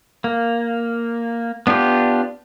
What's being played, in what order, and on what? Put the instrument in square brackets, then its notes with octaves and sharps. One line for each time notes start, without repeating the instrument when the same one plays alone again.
[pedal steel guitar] A#3
B3 D4 F4 G4